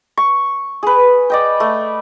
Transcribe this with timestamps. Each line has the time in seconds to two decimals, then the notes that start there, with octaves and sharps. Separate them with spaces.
0.17 C#6
0.83 G#4 B4
1.30 D5 D#5 G5
1.60 A3